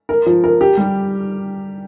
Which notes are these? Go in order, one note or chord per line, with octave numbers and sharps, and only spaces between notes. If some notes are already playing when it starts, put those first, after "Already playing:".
A#4
F3
A#4
G4
G3